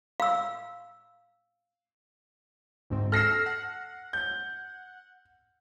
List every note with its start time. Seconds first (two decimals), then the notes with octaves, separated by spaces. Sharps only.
0.20 F5 E6
2.90 D2 G#2 C4
3.12 A4 E6 F6 A#6 C7
3.46 F#5
4.13 G6